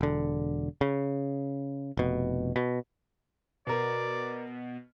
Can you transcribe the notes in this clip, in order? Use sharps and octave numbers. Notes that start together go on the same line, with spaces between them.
E1 D3
C#3
F1 B2
B2
B2 B3 A#4 D5